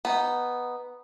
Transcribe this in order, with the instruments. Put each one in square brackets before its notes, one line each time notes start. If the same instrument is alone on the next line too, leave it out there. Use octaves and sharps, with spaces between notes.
[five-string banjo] B3 D#4